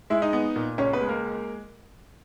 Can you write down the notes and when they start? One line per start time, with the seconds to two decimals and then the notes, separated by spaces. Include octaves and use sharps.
0.10 G#3 E4 E5
0.22 D#4 D#5
0.33 B3
0.56 A#2
0.78 C#2 C#4 C#5
0.93 B3 B4
1.01 G#3
1.09 A#3 A#4